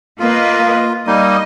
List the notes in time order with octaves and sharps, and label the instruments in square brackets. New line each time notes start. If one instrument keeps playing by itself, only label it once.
[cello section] A#3 B4 D#5 [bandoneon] F4
[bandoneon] G3 A#3 D#4 [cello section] D#5